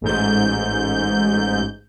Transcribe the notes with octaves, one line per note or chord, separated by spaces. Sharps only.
A1 G#2 G6